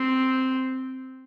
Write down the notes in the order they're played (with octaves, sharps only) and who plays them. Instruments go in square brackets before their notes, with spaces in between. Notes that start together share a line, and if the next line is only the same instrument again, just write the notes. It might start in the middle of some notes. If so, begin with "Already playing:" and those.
Already playing: [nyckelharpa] C4